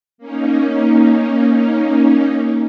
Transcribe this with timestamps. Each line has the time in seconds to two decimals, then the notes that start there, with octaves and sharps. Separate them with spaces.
0.18 A#3 C#4 D#4